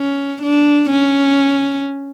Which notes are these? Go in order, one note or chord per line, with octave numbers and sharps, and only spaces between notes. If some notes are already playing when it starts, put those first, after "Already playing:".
Already playing: C#4
D4
C#4